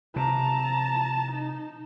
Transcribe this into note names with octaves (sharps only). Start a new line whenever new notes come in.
C3 A5 A#5
D#4